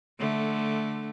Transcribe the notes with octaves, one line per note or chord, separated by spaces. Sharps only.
D3 A3